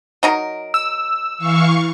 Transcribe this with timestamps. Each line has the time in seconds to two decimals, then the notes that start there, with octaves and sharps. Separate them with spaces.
0.23 F#3 D#4 A#4
0.74 E6
1.38 E3 F5 C#6